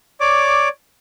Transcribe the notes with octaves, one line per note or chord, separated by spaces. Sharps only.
C#5 D5 D6